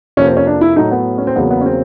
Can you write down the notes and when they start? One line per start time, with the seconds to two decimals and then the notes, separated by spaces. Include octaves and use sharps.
0.17 F2 C3 F3 A#3 C#4
0.27 C4
0.37 C#4
0.47 D4
0.61 E4
0.76 A2 F#3 A3 D#4
0.91 B3
1.18 C#4
1.27 C4
1.36 E2 C#3 F#3 A#3 B3
1.51 B3
1.61 C#4
1.66 C4